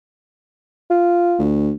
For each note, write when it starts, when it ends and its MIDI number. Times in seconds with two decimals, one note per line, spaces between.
0.91 1.45 65
1.39 1.71 38